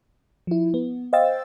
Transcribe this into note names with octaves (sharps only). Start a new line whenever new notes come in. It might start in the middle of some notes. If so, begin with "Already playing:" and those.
F3 E4
B3
C5 D#5 F5 G5 E6 A6